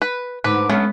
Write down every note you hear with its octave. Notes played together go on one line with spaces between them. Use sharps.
B4
G#2 D3 B4 D6
F#3 G#3 B3 C#4 A4